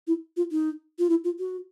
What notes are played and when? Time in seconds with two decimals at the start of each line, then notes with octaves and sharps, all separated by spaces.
0.07 E4
0.37 F4
0.52 D#4
0.99 F4
1.10 E4
1.24 F4
1.39 F#4